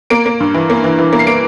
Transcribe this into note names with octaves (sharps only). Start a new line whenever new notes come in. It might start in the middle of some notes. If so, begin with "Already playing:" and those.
A#3 D7
A#3
G2
E3
A#3
E3
E3
A#3
C7
A#3 D7